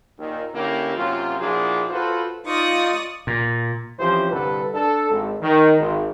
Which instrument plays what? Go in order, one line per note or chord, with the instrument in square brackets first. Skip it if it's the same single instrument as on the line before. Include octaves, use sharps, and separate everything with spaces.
[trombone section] D#2 A#2 D#3
D3 A#3 C#4 E4 G4 A#4
F#2 C3 F#3 A#3 F4
A#2 F3 D4 E4 F#4 G#4
F4 F#4 A4 B4 C5
[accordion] D#4 F4 [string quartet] D5 C#6 D#6
[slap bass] A#2
[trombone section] E3 F3 C4 C#4 G4 C5
C2 G2 D3 A4 B4
D4 A4
G#1
D#3
G#1